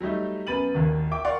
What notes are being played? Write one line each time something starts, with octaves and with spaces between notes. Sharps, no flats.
F#3 G3 A3 D#4
F#2 B3 B5 A6 D#7 F#7
G#1 D#2
E5 G5 D6
A#4 D5 F5 F#5 C6 C#6